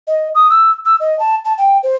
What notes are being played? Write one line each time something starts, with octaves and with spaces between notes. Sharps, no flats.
D#5
D#6
E6
E6
D#5
A5
A5
G5
C5